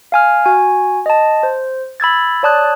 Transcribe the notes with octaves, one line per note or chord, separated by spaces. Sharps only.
F5 G#5 F6
F#4 G#5
D#5 A5
C5
B5 E6 G#6 A6
C#5 D5 A5 D#6 F#6